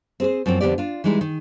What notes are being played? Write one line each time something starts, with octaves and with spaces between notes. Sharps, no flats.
C4 G#4 C5
F#2 F3 A#3 C4
F2 D3 B3 G4 D5
D4 F4
E3 G3 G#3 D#4 E4
D#3